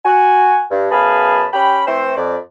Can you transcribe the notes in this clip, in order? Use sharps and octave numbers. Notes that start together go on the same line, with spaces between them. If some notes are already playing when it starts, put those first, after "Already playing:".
F#4 G#5
G2
F#2 B3 G#4 F5 A5 B5
C#4 G4 G5 B5
E3 A3 C4 E4 C5
F2 D5